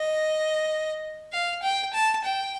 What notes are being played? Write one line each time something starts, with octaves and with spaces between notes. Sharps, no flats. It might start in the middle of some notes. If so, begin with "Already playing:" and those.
Already playing: D#5
F5
G5
A5
G5